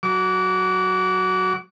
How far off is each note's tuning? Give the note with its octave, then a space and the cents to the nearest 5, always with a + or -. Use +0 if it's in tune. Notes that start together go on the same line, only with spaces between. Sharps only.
F#3 +0 D6 -30